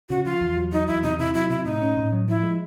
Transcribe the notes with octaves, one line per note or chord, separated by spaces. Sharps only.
C#3 F#4
F3 F4
E2
F#3
F#3 D#4
E2 E4
C3 D#4
C3 E4
F#3 E4
C3 E4
A2 D#4
C#4
A2
F#3
F3 E4
G#3